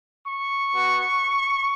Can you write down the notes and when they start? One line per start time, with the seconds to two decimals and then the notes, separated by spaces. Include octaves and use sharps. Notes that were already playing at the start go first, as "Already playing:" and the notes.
0.27 C#6
0.73 B3 F#4